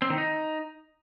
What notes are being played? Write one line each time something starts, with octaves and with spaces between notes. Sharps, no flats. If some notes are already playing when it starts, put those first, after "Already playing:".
C4
D#3
D#4